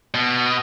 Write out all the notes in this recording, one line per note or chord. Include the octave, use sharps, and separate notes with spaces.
B2